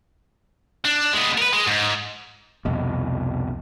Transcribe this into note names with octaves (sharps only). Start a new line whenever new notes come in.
D4
G#3 B3
A#4 B4
G#3
G#2
C2 F2 B2